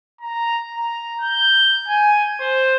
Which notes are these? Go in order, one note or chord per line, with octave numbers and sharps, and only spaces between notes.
A#5
A#5
G6
G#5
C5